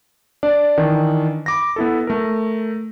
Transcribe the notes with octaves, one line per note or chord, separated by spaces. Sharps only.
D4 D5
D#3 E3 D4
B5 D6 A#6
B3 E4 A4
A3 A#4